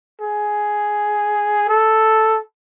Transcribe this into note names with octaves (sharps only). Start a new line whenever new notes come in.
G#4
A4